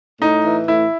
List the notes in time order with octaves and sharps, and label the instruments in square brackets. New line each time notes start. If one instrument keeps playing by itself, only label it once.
[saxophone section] A2 [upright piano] D#4
[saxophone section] E3
[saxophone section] A2 [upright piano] E4